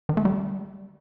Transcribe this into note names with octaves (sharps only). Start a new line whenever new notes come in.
D#3
A3
G3